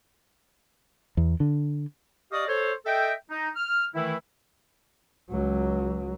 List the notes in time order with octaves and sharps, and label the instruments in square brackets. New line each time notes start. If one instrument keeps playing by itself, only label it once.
[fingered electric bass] E2
D3
[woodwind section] G4 D5 D#5 F5 C#6 D#6
A4 C5 C#5
A4 D#5 E5 G5
D#4
F6
D#3 E3 A3 E4
[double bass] C#2 F#3